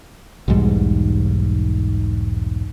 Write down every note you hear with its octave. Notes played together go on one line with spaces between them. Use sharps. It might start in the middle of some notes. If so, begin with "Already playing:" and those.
B1 E2 G#2 G3